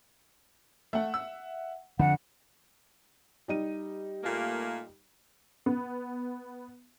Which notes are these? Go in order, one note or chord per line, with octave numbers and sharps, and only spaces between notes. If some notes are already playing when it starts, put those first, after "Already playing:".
A3 E5 F#5
E6
F2 D3 F#5
G3 D#4 D#7
A#2 A3 A#3
B3